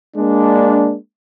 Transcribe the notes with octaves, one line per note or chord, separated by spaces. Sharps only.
G#3 A#3 D4